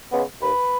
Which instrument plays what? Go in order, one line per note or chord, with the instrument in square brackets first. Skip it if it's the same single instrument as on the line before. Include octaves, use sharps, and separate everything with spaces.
[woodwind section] C#3 G#3 B3
D#2 B4